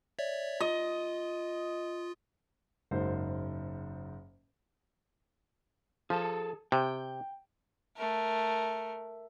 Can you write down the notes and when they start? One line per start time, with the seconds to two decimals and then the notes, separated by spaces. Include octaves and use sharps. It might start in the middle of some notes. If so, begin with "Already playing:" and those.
0.19 C#5 D5 E5
0.60 F4 D#5
2.91 F#1 G#2 C5
6.10 F3 G#4 A4 A5
6.72 C3 G5
7.97 A3 A#4